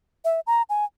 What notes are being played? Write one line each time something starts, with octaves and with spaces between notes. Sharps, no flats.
E5
A#5
G#5